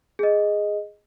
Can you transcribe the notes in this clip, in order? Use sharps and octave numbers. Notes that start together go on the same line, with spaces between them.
G#4 D#5